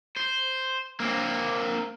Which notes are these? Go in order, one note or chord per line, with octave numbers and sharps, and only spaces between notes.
C5
A#3 C4